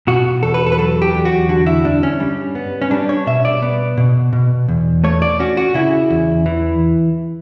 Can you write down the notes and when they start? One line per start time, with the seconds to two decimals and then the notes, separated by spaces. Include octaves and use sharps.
0.07 B2 F#4
0.43 E2 A4
0.54 B4
0.66 A4
0.72 B4
0.78 F#3 A4
1.02 G4
1.14 E2
1.25 F#4
1.49 D3 F#4
1.66 E4
1.85 G2 D4
2.03 C#4
2.20 G3
2.55 B3
2.81 C#4
2.91 G3 D4
3.09 C#5
3.27 B2 E5
3.45 D5
3.62 B3
3.97 B2
4.33 B2
4.68 E2
5.04 A3 C#5
5.22 D5
5.39 C#4 F#4
5.57 F#4
5.74 C#3 E4
6.10 E2
6.46 E3